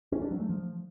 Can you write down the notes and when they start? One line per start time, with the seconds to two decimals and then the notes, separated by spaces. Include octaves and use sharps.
0.12 C#4
0.21 D4
0.31 F#3
0.40 A3
0.49 F3